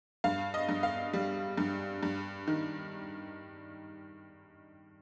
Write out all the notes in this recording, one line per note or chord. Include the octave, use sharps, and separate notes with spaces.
G2 F5
D#5
G2
F5
G3
G2
G2
D#3